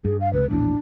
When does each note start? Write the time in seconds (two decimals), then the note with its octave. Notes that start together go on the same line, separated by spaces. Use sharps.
0.05 G2 G#4
0.21 F5
0.33 C#2 C3 B4
0.50 A#1 E2 A2 D4